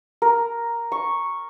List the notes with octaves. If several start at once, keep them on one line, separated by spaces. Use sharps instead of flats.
A#4
C#6